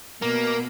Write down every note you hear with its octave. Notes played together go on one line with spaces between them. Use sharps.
B2 A#3